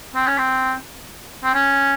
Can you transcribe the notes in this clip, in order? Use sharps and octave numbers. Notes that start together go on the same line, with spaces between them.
C4
C#4
C4
C4
C#4